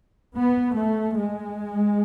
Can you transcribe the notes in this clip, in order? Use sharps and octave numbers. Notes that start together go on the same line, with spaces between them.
B3
A3
G#3